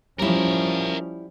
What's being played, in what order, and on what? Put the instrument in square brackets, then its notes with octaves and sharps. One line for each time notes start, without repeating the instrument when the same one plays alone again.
[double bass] F3 C#4 [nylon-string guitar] G3 E4 [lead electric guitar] A#4 E5